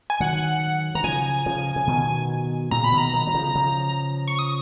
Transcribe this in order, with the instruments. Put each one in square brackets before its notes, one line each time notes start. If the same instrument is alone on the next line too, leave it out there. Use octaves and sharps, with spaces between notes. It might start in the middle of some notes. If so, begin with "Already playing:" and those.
[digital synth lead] G#5
[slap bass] D#3 F#3 [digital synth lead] F#5
[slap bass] D#3 [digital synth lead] A#5
[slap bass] C#3 F3 [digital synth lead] G#5
[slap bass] C#3 F3
C#3
B2 D#3
[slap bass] A#2 C#3 [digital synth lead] A#5
[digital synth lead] B5
[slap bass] B2 D#3
[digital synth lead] A#5
[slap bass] D#3 F#3
F#3
C#3 F3
C#3 F3
[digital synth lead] C#6
D#6